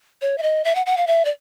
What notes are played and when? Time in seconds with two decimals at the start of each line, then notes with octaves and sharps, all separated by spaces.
0.22 C#5
0.38 E5
0.43 D#5
0.65 E5
0.75 F#5
0.86 F#5
0.97 F5
1.07 E5
1.25 D5